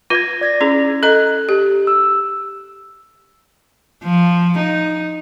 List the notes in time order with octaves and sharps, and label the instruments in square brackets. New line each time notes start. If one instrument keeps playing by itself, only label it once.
[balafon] F4 B4 [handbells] G#6 A#6
[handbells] D5 G#6 A#6
[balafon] C#4 E4 G#4
[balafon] A4 D#5 A#5 [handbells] F#6
[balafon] G4
[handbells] E6
[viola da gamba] F3
D#4